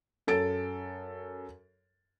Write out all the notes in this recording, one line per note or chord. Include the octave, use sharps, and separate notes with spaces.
F#2 A4 A6 D7